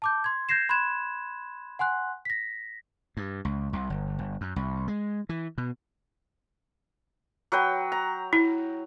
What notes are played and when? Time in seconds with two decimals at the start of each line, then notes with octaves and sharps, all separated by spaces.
0.02 A5 D6 G6
0.24 C6 G#6
0.49 G6 G#6 A#6 C7 E7
0.69 B5 C6 F#6 G#6 E7
1.79 F#5 G#5 C6 F#6
2.25 A#6 B6
3.17 G2
3.45 C#2
3.73 C2
3.90 G1
4.19 G1
4.41 F#2
4.56 C2
4.88 G#3
5.29 E3
5.58 B2
7.52 F#3 B4 G5
7.92 A#5
8.33 E4